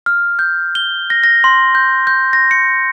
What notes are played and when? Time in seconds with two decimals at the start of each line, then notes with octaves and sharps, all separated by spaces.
0.06 F6
0.39 G6
0.75 G7
1.10 A#6
1.24 A#6
1.44 C6
1.75 G6
2.07 G6
2.33 A#6
2.51 C#7